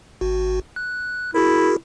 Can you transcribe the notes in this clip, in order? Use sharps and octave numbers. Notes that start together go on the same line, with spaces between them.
G#1 F#4
F#6
E4 F#4 G#4 A#4